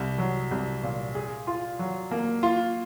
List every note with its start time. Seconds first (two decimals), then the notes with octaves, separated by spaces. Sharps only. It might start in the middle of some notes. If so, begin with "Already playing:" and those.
Already playing: C2
0.18 F#3
0.51 C2
0.83 A#2
1.15 G#4
1.47 F4
1.79 F#3
2.11 A#3
2.43 F4